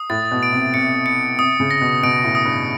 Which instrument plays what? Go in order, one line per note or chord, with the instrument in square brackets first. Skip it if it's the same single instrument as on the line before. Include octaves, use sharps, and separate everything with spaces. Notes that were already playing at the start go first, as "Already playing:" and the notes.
Already playing: [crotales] D#6
[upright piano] A2 [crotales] A6
[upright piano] B2
[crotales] D7
[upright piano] C3
[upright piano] C3 [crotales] C#7
[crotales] C#7
[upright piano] C3 [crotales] D#6
[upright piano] C#3
[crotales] A#6
[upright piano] B2
[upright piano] B2 [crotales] D7
[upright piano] A2
[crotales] D#6
[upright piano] G2